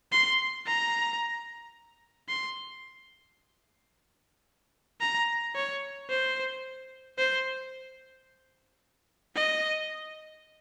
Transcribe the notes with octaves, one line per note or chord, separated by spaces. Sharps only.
C6
A#5
C6
A#5
C#5
C5
C5
D#5